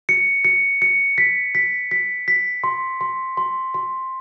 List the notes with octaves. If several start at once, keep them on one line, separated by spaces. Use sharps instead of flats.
C#7
C#7
C#7
B6
B6
B6
B6
C6
C6
C6
C6